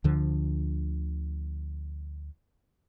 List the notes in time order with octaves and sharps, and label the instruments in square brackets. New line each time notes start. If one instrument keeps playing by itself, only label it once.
[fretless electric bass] D2 D3 F3